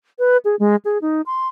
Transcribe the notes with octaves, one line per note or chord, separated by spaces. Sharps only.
B4
G#4
G#3
G#4
D#4
C6